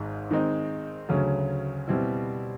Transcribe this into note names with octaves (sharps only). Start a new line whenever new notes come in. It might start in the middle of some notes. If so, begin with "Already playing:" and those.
Already playing: G#1 G#2 G#3
D#3 G#3 C4 D#4
D2 C#3 F#3 A3 C#4
B2 G3 C4 E4